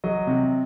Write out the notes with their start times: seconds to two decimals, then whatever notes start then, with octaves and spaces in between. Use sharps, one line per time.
0.04 F#3 D#5
0.27 C3